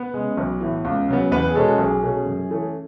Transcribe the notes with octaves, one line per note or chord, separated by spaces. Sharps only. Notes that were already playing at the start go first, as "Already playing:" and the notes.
Already playing: B3 B4
C#3 G#3
B1
A2 E3
C#2
C#3 F#3 B3
E2 B3 B4
G#4
B2 G#3 C#4 A4
B1 G#4
B2 A3 C#4
F#2
E3 A3 C#4